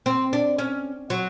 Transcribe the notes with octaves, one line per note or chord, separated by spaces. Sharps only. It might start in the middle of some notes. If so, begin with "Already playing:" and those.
C4
D4
C#4
F#3